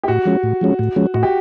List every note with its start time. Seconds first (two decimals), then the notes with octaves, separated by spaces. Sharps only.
0.03 G4
0.08 A2 F#4
0.25 F3 G#3 C#4
0.43 A2
0.61 F3 G#3 C#4
0.79 A2
0.96 F3 G#3 C#4
1.14 A2 F#4
1.23 G4